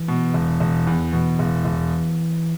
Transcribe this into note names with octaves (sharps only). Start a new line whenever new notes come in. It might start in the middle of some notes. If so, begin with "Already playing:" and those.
Already playing: E3
B2
E1
E1
E2
B2 E3
E1
E1